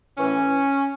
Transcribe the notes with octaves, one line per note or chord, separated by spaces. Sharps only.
A2 E3 C#4